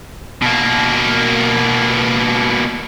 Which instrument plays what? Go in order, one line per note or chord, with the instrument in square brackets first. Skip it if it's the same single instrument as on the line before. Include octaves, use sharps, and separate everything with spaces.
[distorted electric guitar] B2 A#3